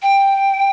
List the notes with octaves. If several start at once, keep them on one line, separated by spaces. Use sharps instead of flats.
G5